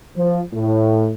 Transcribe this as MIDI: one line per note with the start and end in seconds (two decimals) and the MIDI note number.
0.17 0.40 53
0.53 1.12 45